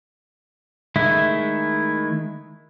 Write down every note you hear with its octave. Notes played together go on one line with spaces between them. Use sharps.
D#3 G#3 A3 E4